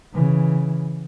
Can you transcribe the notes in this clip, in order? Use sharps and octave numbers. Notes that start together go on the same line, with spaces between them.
C#3 E3